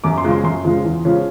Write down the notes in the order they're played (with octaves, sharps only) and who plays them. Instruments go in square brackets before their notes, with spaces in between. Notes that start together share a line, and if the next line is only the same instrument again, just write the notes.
[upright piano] F#2 D6
C6
C#3 F3 G#3
C6
F#2 C6
C#3 F3 G#3
E2
C#3 F3 G#3 C#4